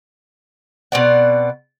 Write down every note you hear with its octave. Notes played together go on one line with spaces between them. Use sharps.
B2 C4 D5 F#5